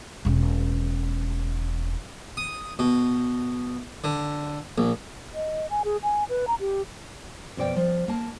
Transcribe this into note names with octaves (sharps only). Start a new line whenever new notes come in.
E1 C#4
D#6
B2
D3
A#1
D#5
G#5
G#4
G#5
B4
A#5
G4
F2 B2 D5 G5
F3
A#3 A5